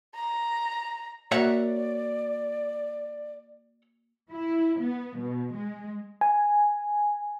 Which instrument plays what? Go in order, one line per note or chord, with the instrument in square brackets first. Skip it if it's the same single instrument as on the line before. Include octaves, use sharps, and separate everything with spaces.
[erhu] A#5
[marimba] A#3 F#4 A#4 [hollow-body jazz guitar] C#5 E5 F#5 [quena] D5
[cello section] E4
B3
B2
G#3
[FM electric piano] G#5